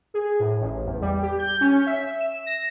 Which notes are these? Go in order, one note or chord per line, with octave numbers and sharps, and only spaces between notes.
G#4
A2
A1
E2
G3
G4
G6
C#4
E5
E7
A#6